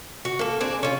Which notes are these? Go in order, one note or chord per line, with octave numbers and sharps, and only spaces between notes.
F#4
A#3 A4
C4 D4 G#4
C#4 F4